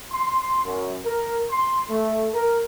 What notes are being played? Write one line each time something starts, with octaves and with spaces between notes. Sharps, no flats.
C6
F#2
A#4
C6
A3
A#4